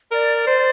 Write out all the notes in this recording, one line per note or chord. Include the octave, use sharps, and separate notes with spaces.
A#4 D5
C5